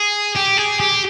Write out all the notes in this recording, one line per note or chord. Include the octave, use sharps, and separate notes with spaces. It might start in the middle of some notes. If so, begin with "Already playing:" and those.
Already playing: G#4
G4
G#4
G4